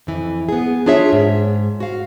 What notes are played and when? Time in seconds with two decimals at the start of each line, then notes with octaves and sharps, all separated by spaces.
0.07 F2 E3
0.49 B3 G#4
0.86 D4 F4 G#4 C#5 E5
1.12 G#2
1.80 F#4 F5